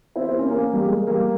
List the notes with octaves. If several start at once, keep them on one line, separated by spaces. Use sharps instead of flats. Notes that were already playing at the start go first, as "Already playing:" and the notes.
C4 E4
C4
A#3 C#4
A#3 C#4
G3 A#3
G#3
G3 A#3